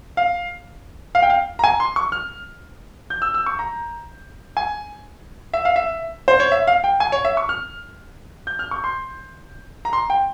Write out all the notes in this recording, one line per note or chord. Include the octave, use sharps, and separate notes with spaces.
F5
F5
G5
F5
A#5
G#5
C6
C#6
F6
G6
E6
E6
C#6
A#5
G#5
E5
F5
E5
C5
C#5
E5
F5
G5
G#5
C#5
E5
C#6
F6
G6
F6
C#6
C6
A#5
C6
G5